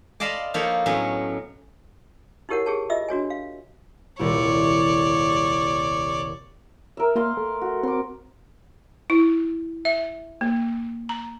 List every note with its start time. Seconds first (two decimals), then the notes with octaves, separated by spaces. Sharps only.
0.20 D5 D#5 F5 A5 B5 C6
0.54 F3 A#3 D#4 A4 C#5 B5
0.86 A2 F#3 B3 C#4
2.49 D#4 E4 G4 A#4 C#5 F#5
2.66 G4 G#4 C#5 A5
2.90 F4 D#5 E5 E6
3.09 D4 F#4 C#5 G#5
3.30 F5
4.19 D#1 C2 E4 C#5 D5
6.97 A#4 E5
7.16 A#3 D#5 F5 C6
7.37 A3
7.61 F#4
7.83 C4 C6 D6
9.10 E4
9.85 E5
10.41 A#3
11.09 A#5